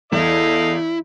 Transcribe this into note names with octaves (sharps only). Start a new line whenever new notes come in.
E2 E4 A4 D#5 F5